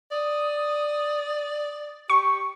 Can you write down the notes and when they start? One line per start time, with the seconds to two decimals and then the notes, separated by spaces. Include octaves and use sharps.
0.11 D5 D#6
2.10 G4 C#6 C#7